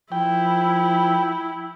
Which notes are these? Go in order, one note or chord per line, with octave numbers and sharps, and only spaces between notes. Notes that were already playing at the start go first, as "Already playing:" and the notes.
F3 E4 G5